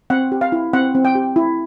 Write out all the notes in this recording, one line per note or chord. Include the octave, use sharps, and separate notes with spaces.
C4 F#5
G4
F5
E4
C4 F#5
C4
G5
G4
E4